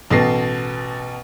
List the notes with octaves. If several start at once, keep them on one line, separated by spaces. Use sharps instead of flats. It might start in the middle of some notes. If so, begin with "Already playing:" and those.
A1 B2 B3 A4 A#6 C7